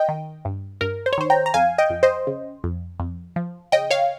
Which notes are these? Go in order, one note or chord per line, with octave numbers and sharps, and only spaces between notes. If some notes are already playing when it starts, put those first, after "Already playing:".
Already playing: D#5 G5
D#3
G2
G2 A#4
C5
C#5
D#3 C5
G5 A#5
A#5
F2 F5 G#5
D#5 G5
F2
C5 D#5
C#3
F2
F2
F3
C#3 D#5 G5
C#5 F5